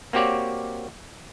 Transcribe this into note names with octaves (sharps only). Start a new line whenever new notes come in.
A#3 C4 F#4 G4 C#5 D5